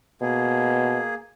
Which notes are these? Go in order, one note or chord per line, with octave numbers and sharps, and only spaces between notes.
B2 A#3 G#4